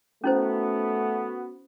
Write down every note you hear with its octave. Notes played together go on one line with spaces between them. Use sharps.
A3 B3 C#4 E4 F#4 C5